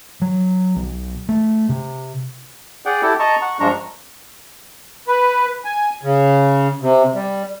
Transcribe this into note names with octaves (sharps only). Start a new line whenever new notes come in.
F#3
B1
A3
C3
G#4 D5 F#5 G5
E4 G4 A4
D#5 A5 A#5 C#6
F#5 C#6
G2 F3 G#3 D4 A#5 C#6
B4
G#5
C#3
C3
G3